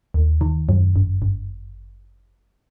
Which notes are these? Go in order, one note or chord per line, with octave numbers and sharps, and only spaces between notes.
D#2
D#3
F#2
G1
G1